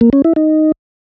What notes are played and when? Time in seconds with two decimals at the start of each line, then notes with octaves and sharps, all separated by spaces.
0.01 A#3
0.13 C#4
0.25 E4
0.36 D#4